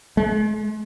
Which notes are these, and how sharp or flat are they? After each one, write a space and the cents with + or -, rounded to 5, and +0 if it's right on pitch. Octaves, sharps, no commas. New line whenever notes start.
G#3 +45